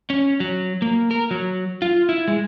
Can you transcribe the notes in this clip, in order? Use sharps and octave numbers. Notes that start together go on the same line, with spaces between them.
C#4
F#3
A#3
A#4
F#3
F4
E4
G#3